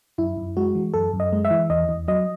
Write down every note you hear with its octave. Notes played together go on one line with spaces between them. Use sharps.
F#2 E4
F#2
G#3 F#4
E3
F#2 A4
F#2
D#5
G#3
E5
E3
E2 D#5
E2
F#3 D#5